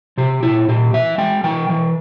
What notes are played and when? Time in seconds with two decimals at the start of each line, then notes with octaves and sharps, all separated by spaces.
0.18 C3 G4
0.43 A#2 E4
0.68 A#2 G4
0.94 E3 E5
1.18 G#3 G5
1.44 E3 G5
1.69 E3